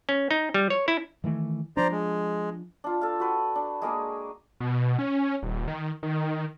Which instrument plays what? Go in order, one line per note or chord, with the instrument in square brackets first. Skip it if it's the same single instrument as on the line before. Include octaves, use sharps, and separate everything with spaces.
[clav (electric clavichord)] C#4
D#4
G3
C#5
E4
[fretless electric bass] D#3 E3 A3
[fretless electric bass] F3 D4 [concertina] C5 D5 A#5
[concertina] G#3
[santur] D4 F4
A4 F5
F#4 B4 G5
D4
G#3 A#3 D4 G#4
[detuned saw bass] B2
C#4
D#1
D#3
D#3